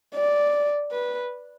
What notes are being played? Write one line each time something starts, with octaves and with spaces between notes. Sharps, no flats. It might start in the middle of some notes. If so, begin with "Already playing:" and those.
D5
B4